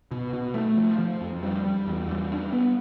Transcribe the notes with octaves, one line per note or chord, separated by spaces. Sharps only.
B2
B2
A3
F3
F3
F2
G3
G3
E2
G3
D4
B3